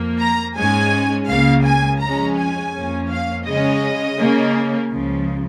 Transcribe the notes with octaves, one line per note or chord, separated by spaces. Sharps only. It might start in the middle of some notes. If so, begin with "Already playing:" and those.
Already playing: F2 F3 A#3
A#5
G#2 G#3 C#4 G#5
C#2 C#3 A#3 F5
G#5
F2 F3 G#3 C#4 A#5
G#5
F2 F3 A#3 C#4
F5
C#3 G#3 C#4 D#5
C#3 A#3 C#4
C#2 C#3 F3